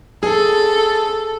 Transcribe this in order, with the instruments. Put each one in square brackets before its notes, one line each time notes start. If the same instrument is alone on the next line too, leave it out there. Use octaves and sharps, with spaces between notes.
[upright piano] G#4 [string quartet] A4